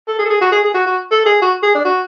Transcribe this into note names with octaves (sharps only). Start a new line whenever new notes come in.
A4
G#4
A4
G#4
F#4
G#4
G#4
F#4
F#4
A4
G#4
F#4
G#4
D4
F#4